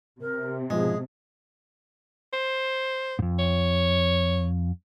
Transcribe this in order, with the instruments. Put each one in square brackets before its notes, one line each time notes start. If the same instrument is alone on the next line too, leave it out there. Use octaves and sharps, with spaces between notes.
[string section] C3 [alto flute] A#4
[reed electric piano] G#2 B2 F3 [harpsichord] G#3 [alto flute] G#4
[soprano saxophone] C5
[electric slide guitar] F2 G#2
[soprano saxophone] C#5